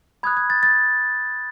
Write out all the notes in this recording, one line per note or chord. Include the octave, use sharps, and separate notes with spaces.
B5 D#6 F#6 G#6
G#6
A6
A6